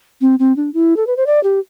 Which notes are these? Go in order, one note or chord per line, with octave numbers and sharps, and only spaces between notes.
C4
C4
D4
E4
A4
B4
C5
D5
G4